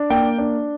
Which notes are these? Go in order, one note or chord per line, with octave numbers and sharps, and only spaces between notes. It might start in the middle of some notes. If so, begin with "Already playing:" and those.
Already playing: D4
A#3 G5
D4